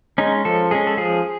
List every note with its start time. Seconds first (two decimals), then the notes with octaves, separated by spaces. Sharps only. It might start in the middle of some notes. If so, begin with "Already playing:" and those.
0.18 G#3 C#4 D#4
0.45 F3 A4
0.71 G#3 C#4 G#4
0.87 A4
0.97 F3 G#4